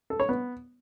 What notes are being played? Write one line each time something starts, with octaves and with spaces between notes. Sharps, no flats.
A4
C#5
B3